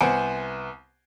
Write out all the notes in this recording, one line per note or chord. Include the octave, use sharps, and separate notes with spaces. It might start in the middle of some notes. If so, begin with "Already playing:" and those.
C2 B3 C5 F#5 G#5 D7